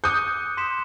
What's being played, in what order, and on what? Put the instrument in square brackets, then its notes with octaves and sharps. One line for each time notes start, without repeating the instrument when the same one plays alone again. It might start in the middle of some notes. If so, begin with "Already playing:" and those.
[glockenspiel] D6 F#6 C#7 [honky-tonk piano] D#6 G6
[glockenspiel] C6 B6 E7